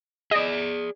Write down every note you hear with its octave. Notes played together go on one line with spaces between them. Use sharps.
G#4 D5 D#5